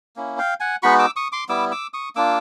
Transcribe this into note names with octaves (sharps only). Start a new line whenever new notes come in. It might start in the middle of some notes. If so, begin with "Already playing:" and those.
A#3 C#4 E4
F5 G5
F#5 G#5
G#3 B3 D#4 F#4 B5 C#6
D6 E6
C#6 D#6
C6 D6
G3 B3 E4 D6 E6
D6 E6
C#6 D#6
A#3 D4 F4 D6 E6